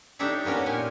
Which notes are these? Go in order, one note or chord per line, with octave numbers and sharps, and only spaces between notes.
D4 D#4 G4 A4 C#5 E5
A#3 B3 C#4 A#4 C#5
A#2 G4 G#5